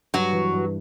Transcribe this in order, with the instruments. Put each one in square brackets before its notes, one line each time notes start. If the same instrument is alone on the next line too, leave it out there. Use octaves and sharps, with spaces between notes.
[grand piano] G2 [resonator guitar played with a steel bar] F#3 F#4
[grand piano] E3
G2